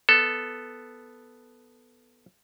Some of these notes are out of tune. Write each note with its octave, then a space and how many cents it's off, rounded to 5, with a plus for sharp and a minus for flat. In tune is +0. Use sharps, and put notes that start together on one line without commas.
B3 +0 A4 +0